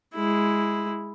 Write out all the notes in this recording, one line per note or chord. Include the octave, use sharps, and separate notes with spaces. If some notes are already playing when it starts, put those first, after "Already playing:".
G#3 E4